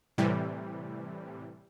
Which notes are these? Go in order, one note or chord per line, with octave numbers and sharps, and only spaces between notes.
A2 C3 E3 G3